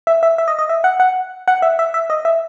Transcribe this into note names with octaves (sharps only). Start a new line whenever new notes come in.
E5
E5
E5
D#5
D#5
E5
F#5
F#5
F#5
E5
E5
E5
D#5
E5